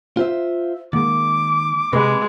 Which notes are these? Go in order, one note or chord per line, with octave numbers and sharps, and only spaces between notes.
F4 C5 E5
D#3 G#3 A#3 D6
C3 G#3 B4